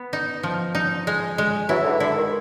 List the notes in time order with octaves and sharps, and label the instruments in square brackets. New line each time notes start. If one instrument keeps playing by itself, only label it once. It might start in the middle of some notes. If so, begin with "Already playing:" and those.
Already playing: [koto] B3
D#4
F3
D#4
G#3
G#3
[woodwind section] E3 F#3 [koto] E4
[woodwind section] D3 E3
[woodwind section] D3 [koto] E4
[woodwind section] D#3